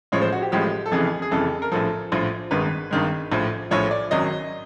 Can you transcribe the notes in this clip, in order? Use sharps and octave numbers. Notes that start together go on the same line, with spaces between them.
A1 A2 F3 G#3 C#5
C5
F#4
G4
A1 A2 F3 G#3 G4
A4
F1 F2 C#3 E3 G#4
G#4
F1 F2 C#3 E3 A4
A#4
A#1 A2 F3 A4
A#1 A2 F3
G#1 G2 D#3 G#3 B4
G#1 G2 D#3 G#3
A#1 A2 F3
A#1 A2 F3 C#5
D5
G#1 F#2 D#3 F#3 D#5